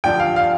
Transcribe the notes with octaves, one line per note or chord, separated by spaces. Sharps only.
G2 D3 F3 D4 F4 G5
F5
F5